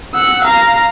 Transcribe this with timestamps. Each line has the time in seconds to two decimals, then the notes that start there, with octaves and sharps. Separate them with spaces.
0.14 F#5 E6
0.45 F5 A#5